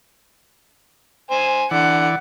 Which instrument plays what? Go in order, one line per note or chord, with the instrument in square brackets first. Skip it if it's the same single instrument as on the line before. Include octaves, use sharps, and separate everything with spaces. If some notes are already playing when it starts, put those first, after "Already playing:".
[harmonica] C5 G#5
[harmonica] D3 [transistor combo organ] E3 D5 [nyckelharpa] F#5